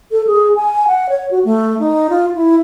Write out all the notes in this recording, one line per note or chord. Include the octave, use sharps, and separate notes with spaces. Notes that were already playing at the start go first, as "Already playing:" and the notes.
A4
G#4
G#5
F#5
C#5
F#4
A3
D#4
F4
E4